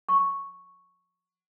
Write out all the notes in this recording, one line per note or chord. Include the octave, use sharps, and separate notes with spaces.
C#6